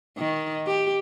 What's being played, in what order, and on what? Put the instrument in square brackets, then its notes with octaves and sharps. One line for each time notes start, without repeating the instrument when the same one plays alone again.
[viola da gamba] D#3
G4